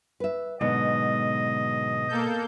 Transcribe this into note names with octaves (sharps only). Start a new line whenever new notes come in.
B4 E5
G#2 B2 D3 F#3 D#5
A#3 A4 G6